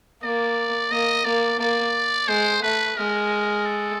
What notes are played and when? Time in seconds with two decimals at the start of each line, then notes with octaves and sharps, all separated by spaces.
0.23 A#3 D5
0.91 A#3 D#5
1.25 A#3 D5
1.59 A#3 D5
2.28 G#3 C5
2.62 A3 B4
2.97 G#3 A#4
3.66 A4